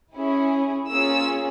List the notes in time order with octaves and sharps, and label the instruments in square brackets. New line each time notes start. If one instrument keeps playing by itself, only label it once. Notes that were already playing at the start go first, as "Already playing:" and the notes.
[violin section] C#4 E4 G#4
A#3 C#4 F4 G#4 E6